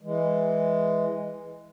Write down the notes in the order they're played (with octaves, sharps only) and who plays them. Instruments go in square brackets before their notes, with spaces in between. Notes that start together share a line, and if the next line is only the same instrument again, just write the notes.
[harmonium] E3 G#3